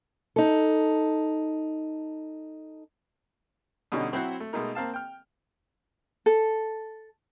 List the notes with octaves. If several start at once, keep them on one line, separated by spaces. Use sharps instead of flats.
D#4 A4
B2 D3 G3 C#4 D#4
F#3 C4 E4 F#4 C5 F#5
A3
B2 G#3 A3 D#4 A#4
A#3 C4 F5 A5
G5 F6
A4